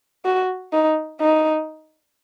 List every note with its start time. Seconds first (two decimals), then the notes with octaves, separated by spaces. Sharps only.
0.25 F#4
0.73 D#4
1.20 D#4